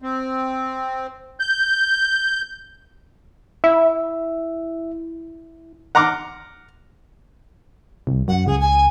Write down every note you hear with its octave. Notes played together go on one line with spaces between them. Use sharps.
C4
G6
E4 E5
F#5 A#5 C6 D6 F6
C2
F#2 F#5
C#2 G#4
G#5